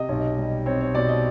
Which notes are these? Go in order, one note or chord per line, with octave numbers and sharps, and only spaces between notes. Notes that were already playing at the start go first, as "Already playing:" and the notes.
Already playing: C3 D#5
B1
G3
C4 C#5
C#5
B2 D5
D#5